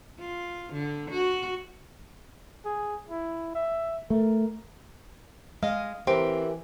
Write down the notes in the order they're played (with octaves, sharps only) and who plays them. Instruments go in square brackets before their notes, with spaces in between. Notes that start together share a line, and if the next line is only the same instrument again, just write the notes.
[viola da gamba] F4
D3
F#4
[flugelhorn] G#4
E4
E5
[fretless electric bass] A3 [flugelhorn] A#4
[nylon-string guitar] G#3 D#5 [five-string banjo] F5
[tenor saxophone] E3 [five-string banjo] C4 [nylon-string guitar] G4 A#4